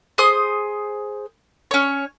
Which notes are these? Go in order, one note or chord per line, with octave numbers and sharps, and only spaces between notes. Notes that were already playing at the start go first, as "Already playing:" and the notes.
G#4 C5 D#6
C#4 C#5